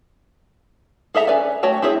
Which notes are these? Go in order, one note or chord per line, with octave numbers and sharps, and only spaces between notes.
G#4 A4 E5 A#5
C#4 B4 D5 G#5
A3 F#4 C#5 G5 A5
C4 E4 G#4 C#5 E5